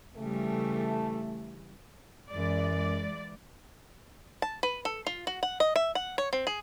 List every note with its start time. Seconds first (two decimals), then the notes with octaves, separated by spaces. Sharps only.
0.17 C#3 E3 G3 A3
2.31 F#2 E3 G#3 D5
4.42 A5
4.63 B4
4.85 A4
5.07 F4
5.27 F#4
5.43 F#5
5.60 D#5
5.76 E5
5.95 F#5
6.18 C#5
6.33 C4
6.47 G#4